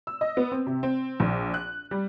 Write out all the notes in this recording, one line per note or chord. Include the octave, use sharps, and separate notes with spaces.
E6
D#5
B3
C4
C3
C4
A#1
F#6
G3